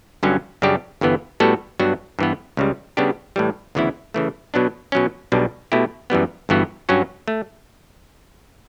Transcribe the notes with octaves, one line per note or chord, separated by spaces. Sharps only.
G1 G2 D3 F#3 C#4
F#2 C#3 G3 D4 G4
G1 G2 E3 B3
A2 G3 B3 F#4 A4
G2 F#3 B3 D4 F#4
G2 E3 B3
C#2 C#3 G3
C#3 G3 B3 D4 G4
A2 E3 G3
D2 C#3 E3 B3 E4
C#3 E3 A3
B2 F#3 B3 D4
B2 F#3 C#4
B1 B2 G3 D4
B2 A3 E4 G4
F#2 E3 G3 B3
G1 G2 E3 B3 F#4
G2 F#3 C#4 F#4
A3